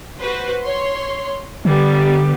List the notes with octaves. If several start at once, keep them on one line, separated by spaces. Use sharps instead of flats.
F#4 B4 C5
C#5 C6
D3 G3 B3